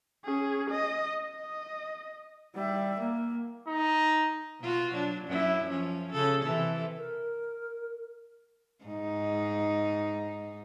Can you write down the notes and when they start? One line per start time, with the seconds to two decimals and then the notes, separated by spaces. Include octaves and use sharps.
0.25 C#4 G#4
0.71 D#5
1.25 D#5
2.54 G3 E5
2.99 A#3
3.68 D#4
4.60 B2 F4 F#4
4.92 F#3 D4
5.27 F#2 F#3 E4
5.70 F3 C#4
6.12 C#3 C#4 A4
6.43 C3 E3 A4
6.98 A#4
8.85 G#2 D#4